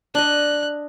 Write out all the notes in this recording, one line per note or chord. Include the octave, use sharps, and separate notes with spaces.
D4 D#5 F#6